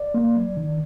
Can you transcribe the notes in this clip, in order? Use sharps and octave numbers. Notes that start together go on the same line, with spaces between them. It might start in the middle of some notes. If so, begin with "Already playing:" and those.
Already playing: D5
A#3
F#3
D#3